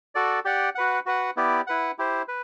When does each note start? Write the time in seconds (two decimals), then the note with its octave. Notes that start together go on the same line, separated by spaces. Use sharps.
0.15 F#4 A4 D5
0.45 G4 D5 F#5
0.75 F#4 B4 F#5
1.06 F#4 B4 F#5
1.37 B3 E4 G4 D5
1.67 E4 B4 F#5
1.98 E4 G4 C5
2.28 B4